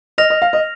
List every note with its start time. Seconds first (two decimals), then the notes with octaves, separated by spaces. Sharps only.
0.18 D#5 F6 A#6 F7
0.30 D#5
0.42 F5
0.53 D#5